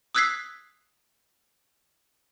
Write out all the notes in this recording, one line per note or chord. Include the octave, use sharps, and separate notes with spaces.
D#6 E6 F#6 G#6 B6 C7